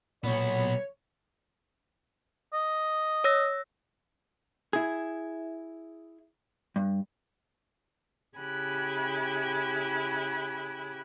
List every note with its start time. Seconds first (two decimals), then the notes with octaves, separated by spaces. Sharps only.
0.24 B1 A#2 B3 C#5
2.53 D#5
3.24 C#5 E6 A#6
4.73 E4 G#4
6.76 G2
8.37 C#3 E4 G4 G#5 B5 F#6